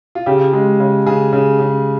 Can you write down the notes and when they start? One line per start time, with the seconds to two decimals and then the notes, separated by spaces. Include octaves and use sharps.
0.15 F4
0.26 C#3 G4
0.53 G#3
0.80 C#3
1.06 C#3 G#4
1.33 C#3
1.60 C#3